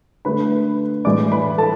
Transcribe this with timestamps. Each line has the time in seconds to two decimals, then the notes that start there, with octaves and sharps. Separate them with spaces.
0.25 D3 A3 B4 B5
1.05 A2 E3 G#3 D5 D6
1.32 B4 B5
1.58 A4 A5